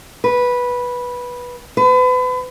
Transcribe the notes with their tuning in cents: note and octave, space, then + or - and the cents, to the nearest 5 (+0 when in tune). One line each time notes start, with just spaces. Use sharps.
B4 -10
B4 +35